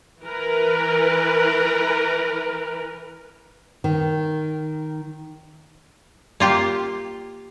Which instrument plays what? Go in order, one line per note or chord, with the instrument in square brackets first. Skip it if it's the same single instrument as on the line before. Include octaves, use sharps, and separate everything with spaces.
[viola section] E3 A#4 B4
[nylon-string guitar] D#3
[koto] A#3 F4 G4